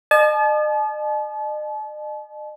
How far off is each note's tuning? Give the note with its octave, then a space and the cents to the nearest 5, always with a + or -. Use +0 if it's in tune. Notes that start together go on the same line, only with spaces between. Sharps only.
D#5 -45 A5 -40